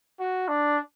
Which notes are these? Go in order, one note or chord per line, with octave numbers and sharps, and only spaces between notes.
F#4
D4